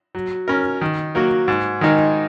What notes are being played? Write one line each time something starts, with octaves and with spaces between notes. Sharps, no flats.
F#3
C#4 A#4
D#3
F#3 A#3 F#4
G#2
D#3 G#3 D#4 A#4